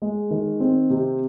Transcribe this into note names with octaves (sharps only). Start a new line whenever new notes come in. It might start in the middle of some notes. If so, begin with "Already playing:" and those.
G#3
D#3
C4
C3